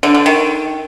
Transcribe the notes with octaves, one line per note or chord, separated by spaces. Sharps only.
D3
D3
D#3